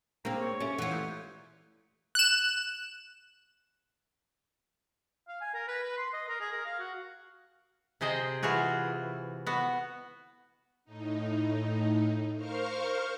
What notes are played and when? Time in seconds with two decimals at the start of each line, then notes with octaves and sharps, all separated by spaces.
0.25 A#3 C4 D4 G#4 F5 A#5
0.41 C#5
0.60 C#4 G4 A4 E5
0.78 E3 F4 A4 F#5
0.91 A3 G6
2.15 F#6 E7
5.28 F5
5.41 G#5
5.54 A#4
5.68 B4
5.83 B4
5.97 C6
6.13 D#5
6.29 A#4
6.40 G#4
6.52 A#4
6.66 F5
6.79 F#4
8.01 C3 G#4 C5 D#5 G5
8.43 E3 F4 F#4 G#4
9.46 B3 F#4
10.85 A2 D#4
12.36 A#4 C5 F5 C#6 F6